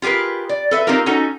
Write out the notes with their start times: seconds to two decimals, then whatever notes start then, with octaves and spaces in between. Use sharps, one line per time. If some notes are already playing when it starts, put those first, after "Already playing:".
0.02 F4 G4 G#4 A#4 B4
0.49 D5
0.71 A4 B4 E5
0.87 C4 D#4 F4 G4 A#4
1.06 C#4 D#4 F#4 A4